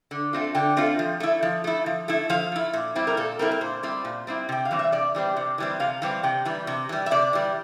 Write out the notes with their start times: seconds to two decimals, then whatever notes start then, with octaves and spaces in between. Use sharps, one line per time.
0.11 D3
0.33 A3 C4 F4
0.55 D3 G5
0.77 A3 C4 F4
0.99 F3
1.20 A3 E4
1.43 F3
1.64 A3 E4
1.86 F3
2.08 A3 E4
2.30 F3 F5
2.52 A3 E4
2.74 A#2
2.95 G3 C4 E4
3.07 A#4
3.17 A#2 A4
3.39 G3 C4 E4 A#4
3.51 A#4
3.61 A#2 C5
3.83 G3 C4 E4
4.05 A#2
4.27 G3 C4 E4
4.49 C3 G5
4.65 F5
4.71 E3 G3 C4
4.79 E5
4.92 C3 D5
5.15 E3 G3 C4
5.37 C3
5.58 E3 G3 C4
5.80 C3 F5
6.02 E3 G3 C4
6.23 C3 G5
6.45 E3 G3
6.67 C3
6.89 E3 G3
7.06 E5
7.11 C3 D5
7.33 E3 G3